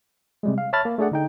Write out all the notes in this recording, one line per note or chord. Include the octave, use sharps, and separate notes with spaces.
C3 G3 G#3
F5
C#5 E5 A5 B5 F6 A6
A#3
A3 D4 G#4 D5 F#5
D3 D#4 G5